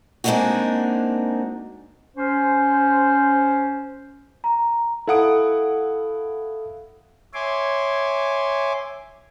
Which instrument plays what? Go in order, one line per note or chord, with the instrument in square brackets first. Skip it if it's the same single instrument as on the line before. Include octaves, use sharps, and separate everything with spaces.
[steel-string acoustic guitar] G#3 A#3 C4 D4 D#4 F#4
[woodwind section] C#4 C5
[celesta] A#5
[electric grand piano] E4 F#5 D7 [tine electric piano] A4 F5 D#6
[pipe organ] C#5 E5 G#5 C6 D6